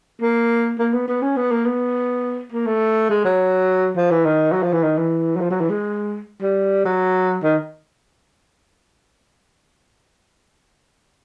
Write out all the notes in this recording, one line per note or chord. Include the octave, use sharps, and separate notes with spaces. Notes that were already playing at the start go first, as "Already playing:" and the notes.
A#3
A#3
B3
B3
C#4
B3
A#3
B3
A#3
A3
G#3
F#3
F3
E3
D#3
F#3
F3
E3
D#3
E3
F#3
F3
F#3
E3
G#3
G3
F#3
D#3